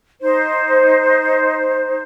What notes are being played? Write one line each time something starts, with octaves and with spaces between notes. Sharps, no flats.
D#4 C5